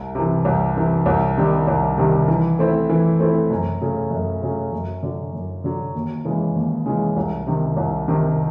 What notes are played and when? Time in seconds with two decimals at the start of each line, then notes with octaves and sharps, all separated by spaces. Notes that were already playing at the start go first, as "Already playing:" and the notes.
Already playing: C2
0.15 C3 E3
0.45 C2
0.76 C3 E3
1.06 C2
1.37 C3 D#3 G3
1.67 C2
1.98 C3 D#3 G3
2.28 E3
2.59 A3 C4 E4
2.90 E3
3.20 A3 C4 E4
3.50 F#2
3.82 C#3 F#3 A3
4.11 F#2
4.42 C#3 F#3 A3
4.72 F#2
5.03 D3 F#3
5.33 F#2
5.64 D3 F#3
5.95 D#2
6.25 C#3 E3 G#3
6.56 D#2
6.86 C#3 E3 G#3
7.16 C2
7.47 C3 D#3
7.77 C2
8.08 C3 D#3